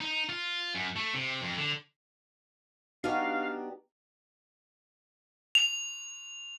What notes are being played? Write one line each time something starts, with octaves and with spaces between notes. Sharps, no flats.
D#4
F4
F#2
A3
C3
F2
D3
B3 D4 D#4 F#4 G4 F5
F7